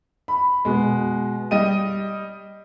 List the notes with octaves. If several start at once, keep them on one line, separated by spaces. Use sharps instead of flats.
B5
B2 G#3
G3 D#5 G5 D#7